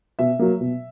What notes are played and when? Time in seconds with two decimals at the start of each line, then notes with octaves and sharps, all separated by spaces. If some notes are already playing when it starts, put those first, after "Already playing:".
0.19 B2 E5
0.39 F#3 A#3
0.61 B2